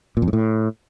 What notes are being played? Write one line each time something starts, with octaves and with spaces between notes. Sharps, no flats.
A#2
F2
G#2
A2